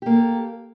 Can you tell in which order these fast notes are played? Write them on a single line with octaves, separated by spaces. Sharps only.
G4 A#3 A4